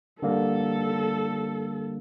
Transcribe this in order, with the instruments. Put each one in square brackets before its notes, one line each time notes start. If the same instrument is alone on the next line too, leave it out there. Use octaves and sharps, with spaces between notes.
[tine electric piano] D3 G3 A#3 [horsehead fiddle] A4